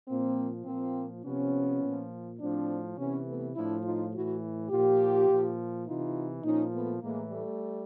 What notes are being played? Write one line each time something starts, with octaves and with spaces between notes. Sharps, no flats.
A#2 F3 A#3 C4
A#2 F3 A#3 C4
C3 F3 B3 C#4
A#2 F3
A2 F3 C4 D4
C3 E3 B3 C#4
A3 B3
A2 F3 D4 E4
D#4 F4
A2 E3 E4 F#4
A#2 F3 F4 G4
A#2 F3
C3 E3 D#4 F4
A#2 F3 C#4 D#4
A3 B3
A2 E3 G#3 A#3
G3 A3